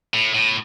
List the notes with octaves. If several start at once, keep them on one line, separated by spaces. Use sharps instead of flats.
A2
A2